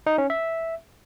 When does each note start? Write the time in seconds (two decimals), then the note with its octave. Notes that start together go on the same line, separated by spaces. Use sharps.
0.06 D#4
0.18 C#4
0.30 E5